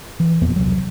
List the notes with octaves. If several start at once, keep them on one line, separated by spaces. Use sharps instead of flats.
E3
E1 F2 A#2 B3
E1 C2 F#3